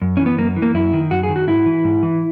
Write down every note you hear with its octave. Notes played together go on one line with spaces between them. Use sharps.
F#2
E3 C#4
B3
F#2 A#3
E3
A#3
F#2 E4
D#3
F#2 F#4
G#4
D#3
F#4
G#2 E4
E3
G#2
E3